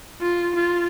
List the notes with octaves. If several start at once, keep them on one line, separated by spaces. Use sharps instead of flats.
F4
F4